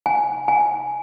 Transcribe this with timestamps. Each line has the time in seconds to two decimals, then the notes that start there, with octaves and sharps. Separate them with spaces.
0.06 G#5
0.48 G#5